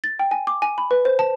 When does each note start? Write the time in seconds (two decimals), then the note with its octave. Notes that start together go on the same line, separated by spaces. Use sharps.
0.04 A6
0.19 G5
0.31 G#5
0.47 D6
0.62 G#5
0.78 B5
0.91 B4
1.05 C5
1.19 A5